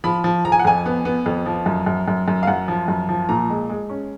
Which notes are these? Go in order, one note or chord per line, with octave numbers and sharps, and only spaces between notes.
F3 B5
F3
F3 A#5
G#5
F#5
F2 G#5
B3
B3
F2
F3
F#2
F#2
F#2
F#2
F5
F#2 F#5
F3
F#2
F3
A#2 A#5
G#3
G#3
C#4